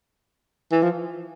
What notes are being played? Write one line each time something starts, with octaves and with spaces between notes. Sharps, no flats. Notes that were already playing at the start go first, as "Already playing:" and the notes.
E3
F3